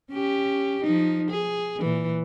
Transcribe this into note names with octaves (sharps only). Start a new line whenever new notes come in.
C#4 G4
F3 D#4
G#4
A#2 E3